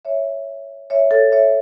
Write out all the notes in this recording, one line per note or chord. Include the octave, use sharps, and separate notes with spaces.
C#5 E5
C#5 E5
A4 C#5
C#5 E5